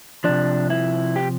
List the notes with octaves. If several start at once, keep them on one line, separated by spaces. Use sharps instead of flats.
C3 F3 D4
E4
G4